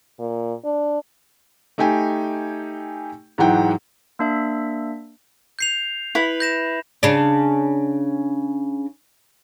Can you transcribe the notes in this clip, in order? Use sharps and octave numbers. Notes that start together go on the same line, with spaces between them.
A#2
D4
A3 D#4 G4 G5 G#5
G#2 E3 F#3 E4 F#5 G5
A#3 D4 E5
G6 C7 F7
E4 B4
G6 A#6 E7
C#3 D4